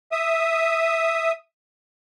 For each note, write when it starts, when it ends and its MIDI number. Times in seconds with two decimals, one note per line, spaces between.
0.12 1.32 76
0.12 1.32 87